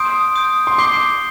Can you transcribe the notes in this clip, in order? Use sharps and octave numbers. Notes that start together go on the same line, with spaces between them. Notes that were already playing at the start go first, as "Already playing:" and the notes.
Already playing: C6 D#6 G6 D7
D#6 G6 D7
C6
D6 G6 C7 G7